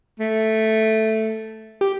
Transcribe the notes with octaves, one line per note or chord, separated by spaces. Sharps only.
A3
G4